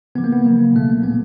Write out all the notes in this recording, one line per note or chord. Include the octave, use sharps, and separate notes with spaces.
C#3 F3 B3
A#3
B3
C#3 F#3 A#3
B2 F#3 A3
A#3
A#2 F3 B3